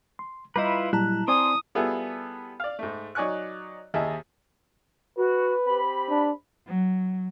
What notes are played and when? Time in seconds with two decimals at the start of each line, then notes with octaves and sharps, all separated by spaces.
0.19 C6
0.56 G3 E4 F4 B4 D#5 A#5
0.93 A#2 F#3 G3 E4 A5 A#5 F#6
1.28 C4 D5 G#5 C6 D#6
1.75 G3 B3 E4 F4 G#4 A4
2.60 D5 F5
2.79 G#2 A3
3.15 F#3 D#4 D5 G#5 C#6 F#6
3.94 D#2 E4 G#4 D#5 A5
5.17 F#4 B4
5.66 C4 G4 B5
6.10 D4
6.65 F#3